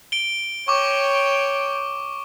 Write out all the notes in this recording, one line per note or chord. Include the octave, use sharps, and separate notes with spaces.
D7 G7
C#5 G5 C#6 D6